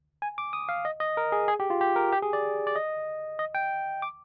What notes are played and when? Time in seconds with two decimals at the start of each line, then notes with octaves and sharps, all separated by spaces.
0.22 G#5
0.38 D6
0.53 D#6
0.69 F5
0.85 D#5
1.00 D#5
1.17 A#4
1.32 G#4
1.48 G#4
1.60 G4
1.70 F4
1.81 G4
1.96 A#4
2.12 G4
2.22 G#4
2.33 D5
2.67 D5
2.76 D#5
3.39 D#5
3.55 G5
4.02 D6